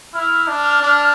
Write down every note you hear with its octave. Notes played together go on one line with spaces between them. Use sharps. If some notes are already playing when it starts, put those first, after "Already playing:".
E4 F6
D4
D4